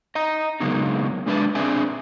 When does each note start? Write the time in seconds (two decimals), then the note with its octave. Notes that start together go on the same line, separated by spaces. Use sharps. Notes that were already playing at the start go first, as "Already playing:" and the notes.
0.15 D#5 A#5
0.60 C#3 F#3 G#3 A#3 B3 D#4
1.26 G#3 D4 B4 E5 A5
1.55 C4 D4 G#4 D5 E5 G#5